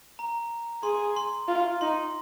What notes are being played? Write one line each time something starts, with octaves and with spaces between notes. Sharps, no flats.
A#5
G#4 C6
C6
F4
D#4 C6